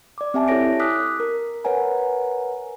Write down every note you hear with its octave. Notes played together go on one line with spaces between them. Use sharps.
D5 D6
C4 G4 E5 G#5 A5
E4 G4 A4 C#5 A#6 D7
D6 D#6 F6 F#6 B6
A#4
A#4 B4 C#5 F#5 G#5 A#5